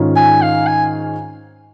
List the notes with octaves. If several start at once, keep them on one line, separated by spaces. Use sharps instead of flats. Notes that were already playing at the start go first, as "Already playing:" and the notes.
Already playing: G#2 D#3 C#4 F4
G#5
F5
G#5